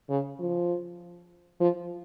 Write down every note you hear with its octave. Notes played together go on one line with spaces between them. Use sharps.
C#3
F3
F3